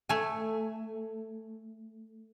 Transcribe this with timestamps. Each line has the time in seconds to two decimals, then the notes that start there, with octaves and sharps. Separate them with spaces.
0.09 A3 G#5